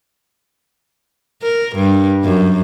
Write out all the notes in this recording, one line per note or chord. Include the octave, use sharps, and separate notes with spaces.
A#4
G2
F#2